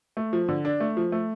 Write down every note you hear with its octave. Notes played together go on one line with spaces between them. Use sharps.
A3
F3
D3
D4
A3
F3
A3